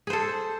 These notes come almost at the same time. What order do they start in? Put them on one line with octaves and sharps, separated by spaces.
G#4 C5 A4